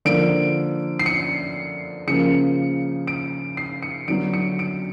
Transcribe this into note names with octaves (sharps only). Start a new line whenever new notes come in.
D3 F3 A#3 D7
C7
C#7
C#3 F3 A#3 C#7
D7
C7
C#7
D3 F#3 B3 D7
C#7
D7